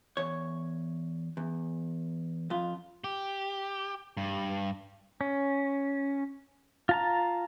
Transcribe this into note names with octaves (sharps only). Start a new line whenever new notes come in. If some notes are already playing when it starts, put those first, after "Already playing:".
E2 C#5
E2
F2 F4
G4
G2
C#4
F4 A5 A#5